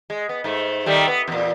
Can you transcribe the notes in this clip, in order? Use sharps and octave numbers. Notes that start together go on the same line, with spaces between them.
G#3
B3
G#2 A3
D#3 G3 A3
B3
E2 A#2